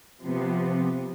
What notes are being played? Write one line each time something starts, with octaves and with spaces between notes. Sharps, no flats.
C3 F3 B3